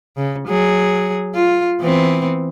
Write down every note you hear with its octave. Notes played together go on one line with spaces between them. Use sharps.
C#3
F#3 G#4
F4
E3 B3 C4